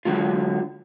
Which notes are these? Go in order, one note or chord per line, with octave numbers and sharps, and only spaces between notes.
D3 F#3 G#3 F4